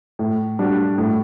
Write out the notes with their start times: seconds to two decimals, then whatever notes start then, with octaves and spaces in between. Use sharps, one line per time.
0.19 A2
0.59 G3 D4 F#4
0.98 A2